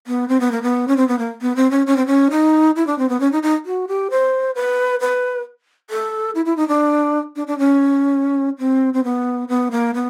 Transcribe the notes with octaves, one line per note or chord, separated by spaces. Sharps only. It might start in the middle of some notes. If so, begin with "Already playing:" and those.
B3
C4
B3
A#3
B3
C#4
C4
B3
A#3
B3
C4
C#4
C#4
C4
C#4
D#4
E4
D4
C4
B3
C#4
D#4
D#4
F#4
G4
C5
B4
B4
A4
E4
E4
D#4
D4
D4
D4
C#4
C4
C4
B3
B3
A#3
B3